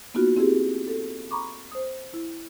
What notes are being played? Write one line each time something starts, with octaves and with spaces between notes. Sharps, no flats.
A#3 B3 D#4 F4 F#4
C4 E4 G4 G#4
A4
A#5 B5 C#6 D6
C5 D#6
E4